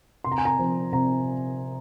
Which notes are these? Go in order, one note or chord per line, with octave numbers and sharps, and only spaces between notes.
C3 C6
A#5
G#5
A#5
F3 C4
C3 A#5